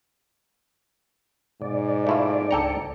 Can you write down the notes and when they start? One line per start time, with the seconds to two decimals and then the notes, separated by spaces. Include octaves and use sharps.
1.62 G#2 B2 D5
2.07 A3 E4 F4
2.51 C#2 D4 A4 G5 A#5 C#7